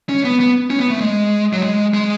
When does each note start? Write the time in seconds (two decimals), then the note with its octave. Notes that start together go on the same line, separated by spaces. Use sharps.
0.09 C#4
0.25 B3
0.40 B3
0.70 C#4
0.80 B3
0.90 A3
1.01 G#3
1.53 F#3
1.63 G#3
1.94 G#3